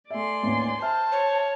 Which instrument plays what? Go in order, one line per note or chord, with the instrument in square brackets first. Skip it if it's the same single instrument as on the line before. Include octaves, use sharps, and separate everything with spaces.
[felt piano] A3 E5 [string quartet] D5 G#5 C6
[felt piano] A1 D#2
[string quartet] C5 [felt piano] E5 F6 [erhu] A5
[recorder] C#5